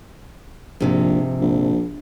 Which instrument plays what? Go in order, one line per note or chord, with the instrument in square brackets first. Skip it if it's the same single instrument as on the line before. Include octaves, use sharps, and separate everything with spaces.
[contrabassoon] A#1 [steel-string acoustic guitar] G#2 C3 F3
[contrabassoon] A#1